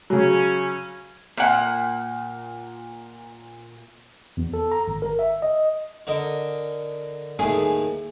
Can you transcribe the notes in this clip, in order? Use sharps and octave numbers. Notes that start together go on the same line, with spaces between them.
C#3 F#3 C#4
A#2 F#5
E2
A4
A#5
G#1
A#4
E5
D#5
D3 A#4 D#5
D#2 A2 G#4